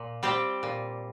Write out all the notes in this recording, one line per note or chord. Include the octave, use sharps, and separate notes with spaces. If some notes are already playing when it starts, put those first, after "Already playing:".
Already playing: A#2
G3 C4 G4
A#2